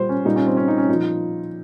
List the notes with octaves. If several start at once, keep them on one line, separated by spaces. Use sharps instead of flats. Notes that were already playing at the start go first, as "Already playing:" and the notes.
Already playing: A#2 G3 C5
C#4
A#2 G3 D#4
C#4
C4
C#4
D#4
C#4
A#2 F3 D#4